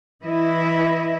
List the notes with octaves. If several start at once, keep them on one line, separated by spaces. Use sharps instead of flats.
E3 E4 D#5 E5